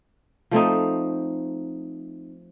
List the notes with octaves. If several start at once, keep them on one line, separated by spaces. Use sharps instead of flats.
F3 A3 C4 D#4